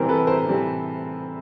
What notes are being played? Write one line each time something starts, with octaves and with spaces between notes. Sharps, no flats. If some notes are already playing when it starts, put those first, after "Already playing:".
Already playing: C3 E3 G3 C4 A#4 C5
A4 B4
A#4 C5
C3 E3 G3 C4